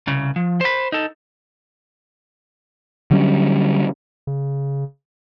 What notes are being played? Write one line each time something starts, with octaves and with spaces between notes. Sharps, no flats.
C2 C#3
F3
C5 B5
D#4 A4
D3 F#3 G3 C#4
C#3